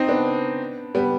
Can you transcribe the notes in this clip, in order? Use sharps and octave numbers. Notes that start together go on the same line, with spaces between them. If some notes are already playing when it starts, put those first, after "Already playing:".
Already playing: C4 D#4
B3 D4
G3 B3